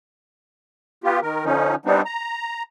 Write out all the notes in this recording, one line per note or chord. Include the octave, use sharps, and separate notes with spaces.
B3 F4 G4
D#3 A#4
D3 F3 C#4 D#4
G3 B3 C4 D4 D#4
A#5